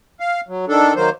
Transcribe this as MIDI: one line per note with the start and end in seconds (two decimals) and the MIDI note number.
0.20 0.41 77
0.48 0.65 54
0.68 0.94 51
0.68 0.94 62
0.68 0.94 69
0.96 1.10 51
0.96 1.10 54
0.96 1.10 58
0.96 1.10 72